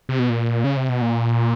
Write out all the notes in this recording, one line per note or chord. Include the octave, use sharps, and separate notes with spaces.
C3
B2
A#2
C#3
C3
B2
A#2